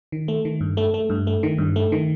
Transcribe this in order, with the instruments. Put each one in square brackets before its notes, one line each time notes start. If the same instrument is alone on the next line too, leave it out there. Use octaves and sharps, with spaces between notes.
[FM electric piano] D#3
A3
D#3
G2
A3
A3
G2
A3
D#3
G2
A3
D#3